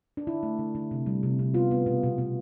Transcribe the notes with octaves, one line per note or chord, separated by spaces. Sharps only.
D4
D3 E4
A3
D3
D3
C3
G3
C3
C3
B3 F4
B3
B2
B2
B2